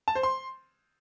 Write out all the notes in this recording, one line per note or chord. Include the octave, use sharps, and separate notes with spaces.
A5
C5
C6